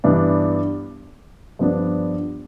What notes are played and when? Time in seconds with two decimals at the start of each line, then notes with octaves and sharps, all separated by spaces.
0.04 G2 E3 B3 D4
1.59 G2 F3 B3 D4